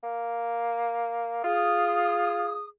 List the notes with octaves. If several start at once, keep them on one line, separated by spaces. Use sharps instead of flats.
A#3
F4 G#4 D#6